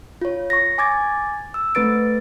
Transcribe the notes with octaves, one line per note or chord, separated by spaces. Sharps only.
F4 C#5
C#6 A#6
G#5 D6 G#6 A6
E6
A3 C4 B4 A6 D7